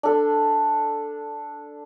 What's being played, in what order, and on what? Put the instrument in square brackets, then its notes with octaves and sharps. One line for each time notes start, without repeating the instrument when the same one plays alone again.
[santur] D4 A4